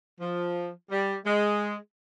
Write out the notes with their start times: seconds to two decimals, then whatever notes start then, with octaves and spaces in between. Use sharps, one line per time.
0.21 F3
0.91 G3
1.26 G#3